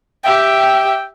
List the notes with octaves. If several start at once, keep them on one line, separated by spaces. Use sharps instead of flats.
G4 E5 G5